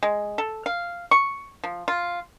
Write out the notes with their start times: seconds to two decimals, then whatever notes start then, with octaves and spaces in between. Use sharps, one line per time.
0.03 G#3
0.38 A4
0.66 F5
1.11 C#6
1.64 F3
1.88 F4